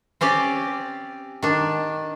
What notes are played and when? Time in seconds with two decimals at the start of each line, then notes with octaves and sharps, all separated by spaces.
0.21 C4 C#4 G4 D5
1.43 D#3 D4